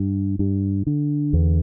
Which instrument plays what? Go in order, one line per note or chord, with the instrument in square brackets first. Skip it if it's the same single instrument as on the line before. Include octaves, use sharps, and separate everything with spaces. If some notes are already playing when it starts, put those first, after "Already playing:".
Already playing: [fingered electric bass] G2
G2
D3
E2